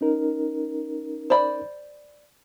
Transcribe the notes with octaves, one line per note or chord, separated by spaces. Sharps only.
C#4 D#4 A#4
C5 D5 B5